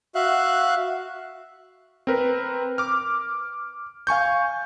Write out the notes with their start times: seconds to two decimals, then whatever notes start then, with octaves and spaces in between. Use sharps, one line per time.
0.15 F#4 E5 F5 F#6
2.07 C4 A#4 B4
2.78 D6 F6
4.07 F5 G#5 C#6 G6